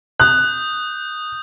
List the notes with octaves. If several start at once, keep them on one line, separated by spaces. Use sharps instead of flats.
D#6 F#6 G6